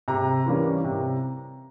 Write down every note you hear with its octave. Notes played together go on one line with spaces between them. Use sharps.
C3 A#5
E3 G3 A#3 C#4
C3